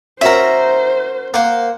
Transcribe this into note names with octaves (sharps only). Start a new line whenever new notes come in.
C#4 F#4 A#4 C5 E5 A#5
A#3 C5 F#5